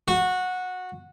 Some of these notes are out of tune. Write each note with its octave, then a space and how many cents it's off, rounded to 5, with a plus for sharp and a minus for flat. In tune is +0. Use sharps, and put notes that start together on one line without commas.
F#4 -15